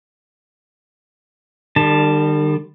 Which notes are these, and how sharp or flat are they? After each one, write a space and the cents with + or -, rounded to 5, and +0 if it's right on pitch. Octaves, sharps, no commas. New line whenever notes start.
D#3 -45 G3 +15 A5 +0